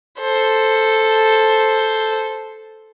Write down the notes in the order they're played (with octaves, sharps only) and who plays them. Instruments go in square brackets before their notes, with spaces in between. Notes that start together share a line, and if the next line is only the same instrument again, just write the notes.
[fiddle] A4 C5